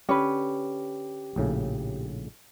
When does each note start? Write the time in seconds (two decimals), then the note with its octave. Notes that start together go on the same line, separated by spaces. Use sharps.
0.09 D3 C#4 G4 B4
1.36 A#1 A2 C#3